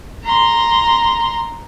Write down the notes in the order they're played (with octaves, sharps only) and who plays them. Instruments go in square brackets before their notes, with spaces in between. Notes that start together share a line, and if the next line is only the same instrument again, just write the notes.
[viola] A#5 C6